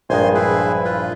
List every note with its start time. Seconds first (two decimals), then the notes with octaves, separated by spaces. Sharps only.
0.10 A#1 G2 G#3 C5 G#5 C6
0.34 E4 G#4 B4
0.85 F4 B4